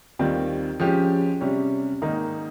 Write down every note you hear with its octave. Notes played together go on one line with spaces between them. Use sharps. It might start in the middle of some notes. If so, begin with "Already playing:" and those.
D#2 D#3 G3 C4 F4
F3 G#3 C#4 G4
C3 G3 C#4
G#2 D#3 A#3 D#4